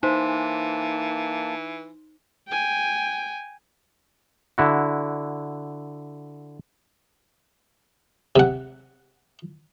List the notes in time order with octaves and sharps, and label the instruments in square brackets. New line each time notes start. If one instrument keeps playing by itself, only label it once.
[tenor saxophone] E3 [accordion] A#3 A5 [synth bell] D#4 [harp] C5
[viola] G5 G#5
[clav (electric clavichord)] D3 E4 F#4
[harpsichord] C3 F#5